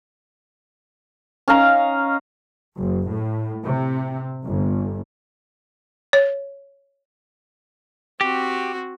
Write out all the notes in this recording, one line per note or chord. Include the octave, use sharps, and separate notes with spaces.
C#4 D#4 F5 A#5
F#1
A2
C3
G1
C#5
C4 F#4 G4